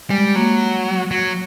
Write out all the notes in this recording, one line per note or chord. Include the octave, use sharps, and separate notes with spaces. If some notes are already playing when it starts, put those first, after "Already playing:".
G3 G#3
F#3 A#3
F#3